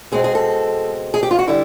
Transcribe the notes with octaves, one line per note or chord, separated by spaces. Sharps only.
B2 G#3 C4 G#4
G#4
A4
G#4
G4
F4
F#4
D3 G3 E4